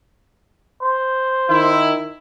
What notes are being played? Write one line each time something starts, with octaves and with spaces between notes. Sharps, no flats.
C5
D#3 E4